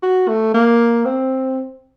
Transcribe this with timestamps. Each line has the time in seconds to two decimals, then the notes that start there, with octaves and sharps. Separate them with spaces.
0.03 F#4
0.28 A3
0.54 A#3
1.05 C4